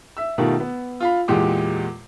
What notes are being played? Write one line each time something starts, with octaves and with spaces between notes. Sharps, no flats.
E5 E6
B2 D#3 A3 F4 G4 A#4
B3
F4 F5 B5
E2 A#2 G#3 G4 D6